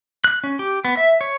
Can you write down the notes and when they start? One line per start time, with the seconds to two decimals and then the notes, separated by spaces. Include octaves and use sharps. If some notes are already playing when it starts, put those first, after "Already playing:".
0.24 F#6
0.44 C#4
0.59 G4
0.85 B3
0.97 E5
1.21 C#5